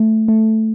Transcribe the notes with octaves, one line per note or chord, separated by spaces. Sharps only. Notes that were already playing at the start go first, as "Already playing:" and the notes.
Already playing: A3
A3